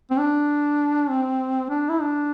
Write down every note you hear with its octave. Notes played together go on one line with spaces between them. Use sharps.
C4
D4
C4
D4
E4
D4